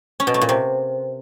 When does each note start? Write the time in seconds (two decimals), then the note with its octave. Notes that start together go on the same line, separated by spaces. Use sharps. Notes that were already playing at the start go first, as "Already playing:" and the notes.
0.20 C#4
0.27 B2
0.34 A3
0.41 A#2
0.49 C3